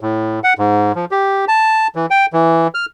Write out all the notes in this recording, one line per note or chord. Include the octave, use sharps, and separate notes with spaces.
A2
F#5
G#2
F3
G4
A5
E3
G5
E3
F6